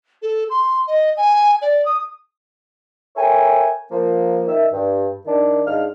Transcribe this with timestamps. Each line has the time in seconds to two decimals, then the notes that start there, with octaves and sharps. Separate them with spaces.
0.22 A4
0.50 C6
0.87 D#5
1.17 G#5
1.62 D5
1.85 D#6
3.16 A4 A#4 C#5 E5 G5 G#5
3.90 F3 A#3
4.47 D#3 E5
4.72 G2
5.26 D#3 D4
5.66 G#2 D4 D#4 F5 F6